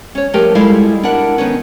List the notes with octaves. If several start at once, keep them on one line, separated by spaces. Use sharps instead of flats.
C#4 C#5
F3 A3 G4 A#4 G5
G3 G#3 E4 F4 A4 F5
D4 E4 A#4 F#5
D#3 B3 C#4